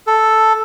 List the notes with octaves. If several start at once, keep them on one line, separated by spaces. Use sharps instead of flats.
A4